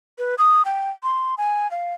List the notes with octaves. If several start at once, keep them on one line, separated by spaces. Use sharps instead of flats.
B4
D#6
G5
C6
G#5
F5